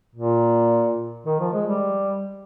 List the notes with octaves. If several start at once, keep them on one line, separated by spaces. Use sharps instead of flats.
A#2
D#3
F3
G#3
G3